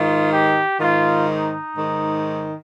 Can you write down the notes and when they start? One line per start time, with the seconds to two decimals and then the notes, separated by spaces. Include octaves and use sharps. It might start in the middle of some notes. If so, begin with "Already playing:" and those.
Already playing: G#2 D#3 F4
0.32 G4
0.80 G#2 D#3 F4
1.29 D#4
1.77 G#2 D#3